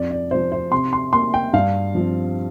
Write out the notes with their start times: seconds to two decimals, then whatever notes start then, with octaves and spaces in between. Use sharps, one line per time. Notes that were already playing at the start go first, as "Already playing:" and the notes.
Already playing: F2 D5
0.11 D5
0.31 C3 F3 C5
0.52 C5
0.72 C3 C6
0.93 C6
1.13 A#3 C6
1.34 G5
1.53 G2 F5
1.95 F3 C4